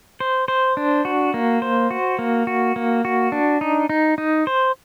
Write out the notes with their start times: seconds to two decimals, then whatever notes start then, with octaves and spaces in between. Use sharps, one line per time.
0.20 C5
0.48 C5
0.77 D4
1.05 F#4
1.34 A#3
1.62 C5
1.91 F#4
2.19 A#3
2.47 F#4
2.76 A#3
3.05 F#4
3.32 D4
3.61 D#4
3.89 D#4
4.18 D#4
4.47 C5